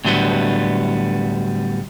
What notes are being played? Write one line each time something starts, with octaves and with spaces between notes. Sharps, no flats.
A2 D3 F#3 G3 B3